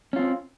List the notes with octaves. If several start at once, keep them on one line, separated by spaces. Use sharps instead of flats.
C4 C#4 F4